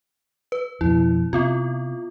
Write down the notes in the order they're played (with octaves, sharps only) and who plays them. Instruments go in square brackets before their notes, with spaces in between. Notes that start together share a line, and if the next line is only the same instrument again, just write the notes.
[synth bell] B4
[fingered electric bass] F2 B2 [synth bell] E4
[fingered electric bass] C3 [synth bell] B3 C4 F4